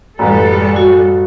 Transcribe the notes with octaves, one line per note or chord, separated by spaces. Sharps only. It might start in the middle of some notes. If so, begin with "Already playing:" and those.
A1 F#2 G3 A4 B4
F#4